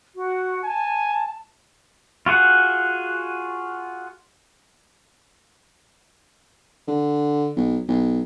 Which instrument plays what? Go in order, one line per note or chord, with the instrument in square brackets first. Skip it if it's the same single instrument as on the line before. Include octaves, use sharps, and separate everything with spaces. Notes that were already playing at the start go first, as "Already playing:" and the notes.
[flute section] F#4
[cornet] G#5 [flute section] A5
[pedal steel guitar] F4 F#4 G#4 F#5
[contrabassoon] D3
B1
B1